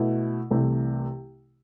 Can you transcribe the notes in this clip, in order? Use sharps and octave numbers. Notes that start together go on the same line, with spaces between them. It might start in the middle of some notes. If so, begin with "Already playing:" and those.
Already playing: B2 A3 E4
C2 C3 E3 A3